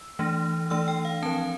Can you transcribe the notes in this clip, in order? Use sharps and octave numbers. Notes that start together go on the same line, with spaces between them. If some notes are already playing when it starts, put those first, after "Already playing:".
Already playing: E6
E3 A3 D4
E3 A3 D4 E6
G5
F5
F3 C4 A5